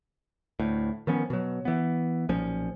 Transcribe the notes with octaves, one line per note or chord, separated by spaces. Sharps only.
D2 A2
D#3 F3 B3 C#4
B2 F#3
E3 B3
B1 A#2 F3 C#4